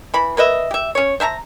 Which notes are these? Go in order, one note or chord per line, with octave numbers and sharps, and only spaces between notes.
E3 B5
A#3 B4 D#5 E5
G4 E5
C#4 C#5
C5 E5 A5 A#5